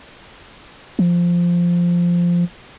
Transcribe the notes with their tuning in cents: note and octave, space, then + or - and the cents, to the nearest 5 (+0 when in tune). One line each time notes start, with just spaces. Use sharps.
F3 -5